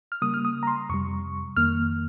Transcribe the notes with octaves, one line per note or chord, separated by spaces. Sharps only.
F6
C#3 G3 A#3 D#6
F6
D#6
A#5
C6
F2 C3 G3 C#6
F2 D#3 A#3 F6